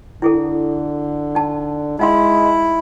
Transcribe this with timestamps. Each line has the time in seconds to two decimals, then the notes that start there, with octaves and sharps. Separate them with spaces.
0.22 D3 E4 G#4 A4
1.35 D#4 A5
1.99 G#3 D#4 E4 F5 C6